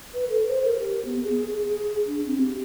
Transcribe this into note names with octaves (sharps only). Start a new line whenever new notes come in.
B4
A4
C5
A#4
G4
B3
G#4
G#4
D4
C4
G4